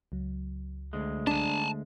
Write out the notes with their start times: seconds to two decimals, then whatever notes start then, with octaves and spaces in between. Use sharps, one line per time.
0.12 C#2 F#3
0.93 D2 G#3
1.27 D4 G#5 A5